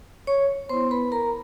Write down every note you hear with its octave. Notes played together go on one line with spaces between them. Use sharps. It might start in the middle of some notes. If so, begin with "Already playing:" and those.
C#5 C#6
B3 E4 C5 C6
B4 B5
A#4 A#5